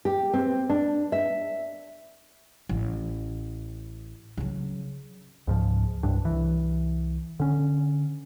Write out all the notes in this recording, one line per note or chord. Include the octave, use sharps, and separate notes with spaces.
G4
C4
D4
E5
A1
C#3 F#3
C#2 G#2 F3
C2 G2 D4
C2 E3
D3 C#4